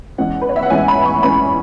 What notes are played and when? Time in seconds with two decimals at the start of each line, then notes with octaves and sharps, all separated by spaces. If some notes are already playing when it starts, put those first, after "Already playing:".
0.18 E2 E3 G#3 C#4 F#5
0.42 B4
0.49 C#5
0.56 E5
0.63 F#5
0.70 E2 E3 G#3 C#4 G#5
0.88 B5
1.06 C#6
1.23 E2 E3 G#3 C#4 B5